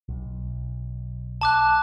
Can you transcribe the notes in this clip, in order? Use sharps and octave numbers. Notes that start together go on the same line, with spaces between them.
B1
A5 D6 F#6